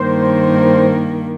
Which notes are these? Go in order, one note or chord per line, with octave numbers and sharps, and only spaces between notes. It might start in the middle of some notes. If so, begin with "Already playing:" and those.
Already playing: G2 D#3 A#3 C5